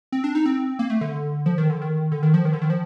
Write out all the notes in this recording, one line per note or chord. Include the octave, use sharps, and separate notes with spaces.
C4
D4
D#4
C4
A#3
A3
D3
F3
D#3
D3
D#3
D3
D#3
F3
D#3
D3
D#3
F3